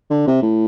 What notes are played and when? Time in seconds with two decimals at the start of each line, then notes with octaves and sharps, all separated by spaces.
0.10 D3
0.27 C3
0.42 A2